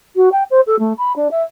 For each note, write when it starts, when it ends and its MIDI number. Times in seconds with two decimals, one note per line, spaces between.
0.16 0.29 66
0.32 0.43 79
0.51 0.60 72
0.67 0.78 69
0.79 0.93 57
0.98 1.13 83
1.16 1.28 62
1.31 1.43 76